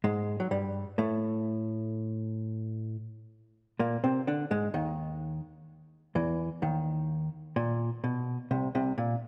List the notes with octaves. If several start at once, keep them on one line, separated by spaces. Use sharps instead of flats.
G#2 G#3
F#3
G2 G3
A2 A3
A#2 A#3
C3 C4
D3 D4
G#2 G#3
D#2 D#3
E2 E3
D#2 D#3
A#2
B2
C2 C3
C2 C3
A#2